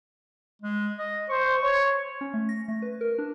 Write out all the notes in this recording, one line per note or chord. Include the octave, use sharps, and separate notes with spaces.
G#3
D#5
C5 C#6
C#5
C#4
A3
A#6
A3
B4
A#4
D4